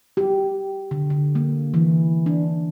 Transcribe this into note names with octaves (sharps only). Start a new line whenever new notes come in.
G4
D3
D3
A#3
E3
D4